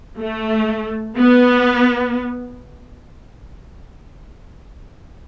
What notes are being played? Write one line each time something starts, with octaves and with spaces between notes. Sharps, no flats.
A3
B3